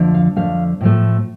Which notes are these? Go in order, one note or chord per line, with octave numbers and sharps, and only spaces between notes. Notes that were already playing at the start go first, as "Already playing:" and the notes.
Already playing: F2 D3 F3 A3
F5
F2 D3 F3 A3 F5
A2 F3 A3